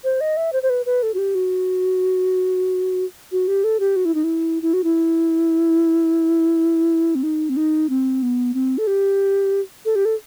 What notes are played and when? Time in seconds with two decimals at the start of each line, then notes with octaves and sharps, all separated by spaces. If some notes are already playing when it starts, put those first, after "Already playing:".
0.04 C5
0.21 D#5
0.37 E5
0.53 C5
0.63 C5
0.70 B4
0.86 B4
1.03 A4
1.14 F#4
1.18 G4
1.35 F#4
3.32 F#4
3.48 G4
3.64 A4
3.80 G4
3.96 F#4
4.05 E4
4.15 D#4
4.24 E4
4.62 E4
4.73 F#4
4.84 E4
7.15 C4
7.23 D#4
7.49 C4
7.57 D#4
7.89 C4
8.23 B3
8.54 C4
8.78 A4
8.87 G4
9.85 A4
9.95 G4
10.05 A4